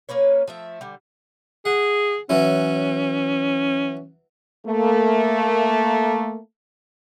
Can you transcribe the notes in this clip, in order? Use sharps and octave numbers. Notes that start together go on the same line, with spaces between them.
A#3 C#4 B4 C#5
F3 A3 E5
D3 G3
G#4 F#5
E3 F#3 C#4 E4
A3 A#3